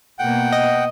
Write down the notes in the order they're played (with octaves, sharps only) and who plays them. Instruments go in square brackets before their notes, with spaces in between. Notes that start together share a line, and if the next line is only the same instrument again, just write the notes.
[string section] B2 A#3 [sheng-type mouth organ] F#5 G5
[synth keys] D#5